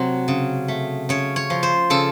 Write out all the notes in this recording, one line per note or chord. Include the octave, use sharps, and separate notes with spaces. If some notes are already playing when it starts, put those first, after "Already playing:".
Already playing: C3 F#3 A3 C5
C#3
A3
C#3 C#5
C#5
F3
C5
C#3 A4